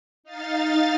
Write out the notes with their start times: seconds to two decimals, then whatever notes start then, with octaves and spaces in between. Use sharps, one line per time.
0.24 D#4 F5 A6